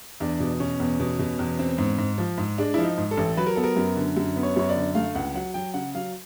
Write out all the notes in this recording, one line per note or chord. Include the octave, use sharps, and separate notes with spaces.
E2 D4
B2
B2 C#4
E2
B2
B2
E2
C4
G#2
G#2
F3
G#2
G#3 D4
F3 E4
D#4
G#2
A4
A1
F#3 B4
A#4
B3 A4
A#4
F#2
D3
F#2
B3
C#5
F#2 C#5
D5
D3
A3 F5
C#2 F#5
F#3 F#5
F#3 G5
C#3 F#5
F#3 F5